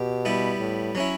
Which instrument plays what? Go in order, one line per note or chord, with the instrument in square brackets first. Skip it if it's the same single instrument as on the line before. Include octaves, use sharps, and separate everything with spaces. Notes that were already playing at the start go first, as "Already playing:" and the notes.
Already playing: [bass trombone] B2 [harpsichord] G4
[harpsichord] G3 B3 E4
[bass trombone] A2
[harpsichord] F#3 C#4 E4